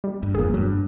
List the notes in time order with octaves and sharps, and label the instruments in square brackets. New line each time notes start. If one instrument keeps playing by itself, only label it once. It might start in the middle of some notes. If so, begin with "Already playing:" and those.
[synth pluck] G3
[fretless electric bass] G2
[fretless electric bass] F#1 E2 [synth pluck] A#2 G#4
[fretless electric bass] G2 [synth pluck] F#3